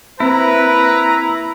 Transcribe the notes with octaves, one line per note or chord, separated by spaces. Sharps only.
A#3 C4 E4 B4 A#5